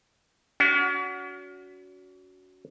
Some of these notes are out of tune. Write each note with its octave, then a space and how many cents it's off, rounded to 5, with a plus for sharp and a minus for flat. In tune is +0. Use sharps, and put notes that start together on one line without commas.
C#4 +40 F#4 +0